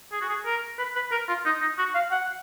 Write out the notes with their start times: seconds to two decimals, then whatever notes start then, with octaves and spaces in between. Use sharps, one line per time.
0.12 G#4
0.21 F#4
0.29 G#4
0.46 A#4
0.79 B4
0.96 B4
1.12 A#4
1.28 F4
1.45 D#4
1.62 D#4
1.78 F#4
1.95 F5
2.11 F#5